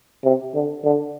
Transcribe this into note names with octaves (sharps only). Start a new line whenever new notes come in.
C3
D3
D3